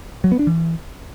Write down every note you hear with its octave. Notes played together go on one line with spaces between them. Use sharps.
F#3
B3
D4
E3